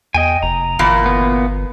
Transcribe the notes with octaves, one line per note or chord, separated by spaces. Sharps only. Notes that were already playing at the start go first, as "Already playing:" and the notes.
E2 D#5 G5 G#5
F1 A#5
G1 E2 A#2 A#3
B3